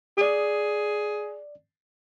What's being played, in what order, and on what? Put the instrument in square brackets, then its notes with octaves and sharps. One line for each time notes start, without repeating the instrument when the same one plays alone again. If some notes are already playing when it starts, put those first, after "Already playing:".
[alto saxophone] G#4 [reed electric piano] D5 D#6